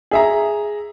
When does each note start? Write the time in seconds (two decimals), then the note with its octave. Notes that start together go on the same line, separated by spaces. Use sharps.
0.11 G#4 E5 A#5